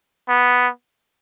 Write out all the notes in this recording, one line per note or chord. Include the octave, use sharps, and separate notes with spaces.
B3